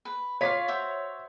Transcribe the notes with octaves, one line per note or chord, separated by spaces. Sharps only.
B4
F4 C#5 D5 F5 B6
F#4 C5 E5